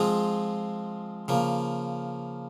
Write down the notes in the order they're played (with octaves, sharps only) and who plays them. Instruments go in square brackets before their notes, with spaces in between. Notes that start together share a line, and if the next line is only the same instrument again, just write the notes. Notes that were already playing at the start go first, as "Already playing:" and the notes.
Already playing: [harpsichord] F3 G#3 C4 F4 G#4
C#3 F3 A#3